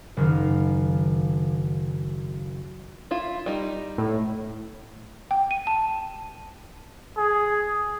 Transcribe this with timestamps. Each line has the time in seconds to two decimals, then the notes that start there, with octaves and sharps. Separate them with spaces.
0.17 F#1 D#3 F5
3.11 E4 F4
3.46 G3 D#4
3.98 A2
5.31 G5
5.51 D#7
5.67 A5
7.17 G#4